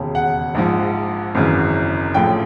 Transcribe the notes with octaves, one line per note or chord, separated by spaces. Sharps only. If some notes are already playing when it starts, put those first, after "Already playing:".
Already playing: E1 D#2 C#3
F#5
A#1 G#2 F3
G#1 F#2 C#3 E3
A#1 A2 F3 G5